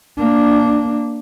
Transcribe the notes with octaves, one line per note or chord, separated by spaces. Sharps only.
A#3 D4